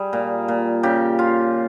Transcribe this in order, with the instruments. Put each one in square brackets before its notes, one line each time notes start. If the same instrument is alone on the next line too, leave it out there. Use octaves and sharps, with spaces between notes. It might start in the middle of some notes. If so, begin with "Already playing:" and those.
Already playing: [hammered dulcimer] G3 G#4
A#2
A#2
C#3 G4
F4